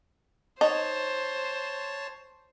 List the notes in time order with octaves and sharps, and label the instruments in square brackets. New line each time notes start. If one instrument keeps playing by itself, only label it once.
[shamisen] D#4 [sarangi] C5 [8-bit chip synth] C#5 A5